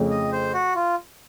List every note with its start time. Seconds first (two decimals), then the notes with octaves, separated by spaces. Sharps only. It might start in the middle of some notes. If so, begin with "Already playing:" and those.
Already playing: F2 C#3 A3
0.11 D#5
0.32 C5
0.54 F#4
0.76 F4